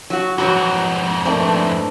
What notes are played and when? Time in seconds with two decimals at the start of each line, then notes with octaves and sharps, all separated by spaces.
0.10 F#3 F#4
0.38 F2 G#2 E3 F#3 F#4
1.25 D#3 A3 C4 D5
1.40 E3 D4